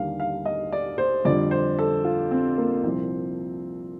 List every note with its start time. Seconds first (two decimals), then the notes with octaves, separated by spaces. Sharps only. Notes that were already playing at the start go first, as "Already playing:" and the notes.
Already playing: D#2 D3 G3 F5
0.20 F5
0.46 D#5
0.72 D5
0.98 C5
1.25 F2 D3 G3 D5
1.51 C5
1.79 A4
2.04 F4
2.31 C4
2.58 A#3
2.83 C2 A#2 F3 C4